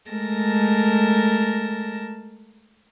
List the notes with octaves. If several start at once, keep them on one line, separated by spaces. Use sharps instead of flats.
G#3 A3 A#4 A5 A#6